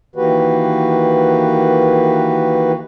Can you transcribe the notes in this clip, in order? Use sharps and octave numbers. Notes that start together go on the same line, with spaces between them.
D#3 E3 A#3 F#4 G4 B4